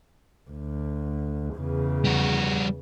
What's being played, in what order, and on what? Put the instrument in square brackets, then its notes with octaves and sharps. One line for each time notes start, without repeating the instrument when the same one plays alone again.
[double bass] D2
E2 C#3
[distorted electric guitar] G3 F#4